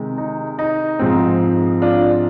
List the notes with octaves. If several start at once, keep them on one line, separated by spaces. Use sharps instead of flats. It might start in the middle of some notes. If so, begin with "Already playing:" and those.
Already playing: C3 D#3 G#3
D#4
D#4
G#2 F3 G#3 C4
D4 F4